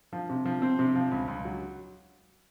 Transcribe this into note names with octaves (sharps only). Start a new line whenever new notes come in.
F3
C3
F3
C4
C3
F3
C#2
C#2
F#3